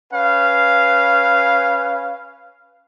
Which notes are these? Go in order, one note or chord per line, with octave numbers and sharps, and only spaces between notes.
C#4 B4 F5